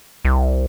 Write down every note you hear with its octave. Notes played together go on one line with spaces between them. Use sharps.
C2